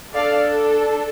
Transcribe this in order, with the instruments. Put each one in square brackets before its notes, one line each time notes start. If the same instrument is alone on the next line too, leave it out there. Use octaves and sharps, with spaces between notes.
[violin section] D4 A4 D5 F5